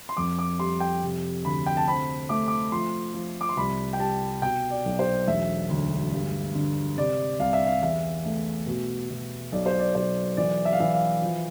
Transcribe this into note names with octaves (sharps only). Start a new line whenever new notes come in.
C6
F2 D6
D6
G3 C6
G5
C3
D2 B5
G5
A5
C4 B5
A3 D6
D6
F3 C6
F3
D6
C6
C2 B5
G5
G3 A5
B2 G5
D5
B1
C5
E1 E5
D2
G2
D3
C3 D5
C2 F5
E5
F5
E2 E5
A3
B2
B2
B1 D5
C5
D5
B1 C5
E3 D5
E5
F5
E3 E5
F5
F3